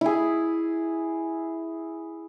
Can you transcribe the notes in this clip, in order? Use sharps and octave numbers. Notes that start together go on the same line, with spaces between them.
E4 G#4